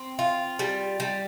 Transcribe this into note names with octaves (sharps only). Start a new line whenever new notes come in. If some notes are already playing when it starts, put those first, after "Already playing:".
Already playing: C4
F4
G3
G3